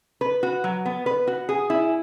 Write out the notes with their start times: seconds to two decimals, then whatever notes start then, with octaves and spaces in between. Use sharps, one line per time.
0.21 B4
0.43 F#4
0.64 F#3
0.86 B3
1.06 B4
1.27 F#4
1.49 G#4
1.70 E4